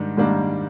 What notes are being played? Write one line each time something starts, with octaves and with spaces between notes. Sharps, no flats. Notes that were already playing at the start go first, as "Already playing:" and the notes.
Already playing: G#2 D#3 G3 D4
G#2 D#3 G3 A#3 D4